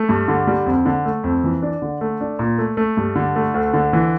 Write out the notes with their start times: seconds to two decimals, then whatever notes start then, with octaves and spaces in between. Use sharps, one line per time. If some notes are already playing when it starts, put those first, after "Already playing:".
Already playing: A3
0.09 G2
0.28 D3
0.47 G3
0.66 F2
0.85 D3
1.05 A3
1.24 F2
1.44 E3
1.62 D4
1.82 D3
2.01 A3
2.21 D4
2.39 A#2
2.58 A3
2.77 A3
2.97 G2
3.16 D3
3.36 A3
3.54 D2
3.74 D3
3.93 E3